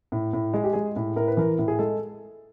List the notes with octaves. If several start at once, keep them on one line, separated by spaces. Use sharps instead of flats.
A2
A2
G#3 G#4
G4
G#3 G#4
A2
A2 A#4
B4
E3 A#4
A2
G#4
G#3 A4